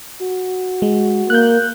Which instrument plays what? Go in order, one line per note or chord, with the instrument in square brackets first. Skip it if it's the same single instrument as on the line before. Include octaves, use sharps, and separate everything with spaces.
[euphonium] F#4
[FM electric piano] G#3
[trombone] A#3 [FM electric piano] F#6 G6